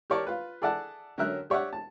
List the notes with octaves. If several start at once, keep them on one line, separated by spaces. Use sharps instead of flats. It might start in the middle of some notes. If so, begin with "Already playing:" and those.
G4 A#4 C#5 D5 A5
F4 B4
G#4 A4 D5 E5 F#5 A5
D3 F#3 C#4 A#4 E5 F#6
G4 C#5 D5 E5 F#5
A5